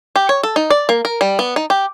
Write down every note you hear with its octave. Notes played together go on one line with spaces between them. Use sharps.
G4
C#5
A4
D#4
D5
A#3
A#4
G3
B3
D#4
G4